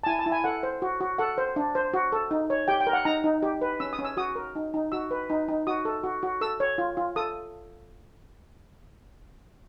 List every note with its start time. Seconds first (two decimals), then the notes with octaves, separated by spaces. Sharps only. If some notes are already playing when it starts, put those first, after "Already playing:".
0.03 A5
0.06 E4 G#5
0.19 A5
0.26 E4
0.32 G#5
0.44 A4 F#5
0.63 C5
0.82 F#4
1.01 F#4
1.18 A4 F#5
1.38 C5
1.56 D4
1.75 C5
1.94 F#4
2.12 A4
2.31 D#4
2.50 C#5
2.68 G4 G5
2.81 G5
2.87 A#4
2.93 F#5
3.05 D#4 A#5
3.24 D#4
3.42 G4
3.61 B4
3.80 C#4 E6
3.93 D#6
3.99 C#4
4.05 E6
4.17 F#4 D#6
4.36 A#4
4.55 D#4
4.74 D#4
4.92 F#4 E6
5.11 B4
5.30 D#4
5.48 D#4
5.67 F#4 D#6
5.85 A4
6.03 F#4
6.23 F#4
6.41 A4 E6
6.60 C#5
6.78 F4
6.97 F4
7.16 A4 D#6